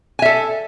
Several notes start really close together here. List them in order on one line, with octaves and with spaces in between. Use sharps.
G#5 E5 A4